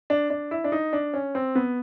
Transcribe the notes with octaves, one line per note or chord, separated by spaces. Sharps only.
D4
D4
E4
D4
D#4
D4
C#4
C4
B3